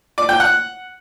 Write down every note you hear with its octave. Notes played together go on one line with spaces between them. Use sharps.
D5
G5
F#5